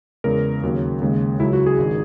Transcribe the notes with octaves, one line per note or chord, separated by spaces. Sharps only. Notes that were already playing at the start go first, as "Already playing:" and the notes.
E2 C#3 G#3 A#4
D#2 C#3 F#3
D#2 C#3 G#3
C#2 C#3 F#3 E4
F#4
G#4
G#1 D#3